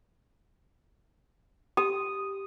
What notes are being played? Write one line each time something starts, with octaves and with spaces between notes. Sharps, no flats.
G4 D#6